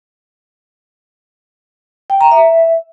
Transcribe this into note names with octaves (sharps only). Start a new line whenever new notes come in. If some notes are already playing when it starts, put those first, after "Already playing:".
G5
A#5
E5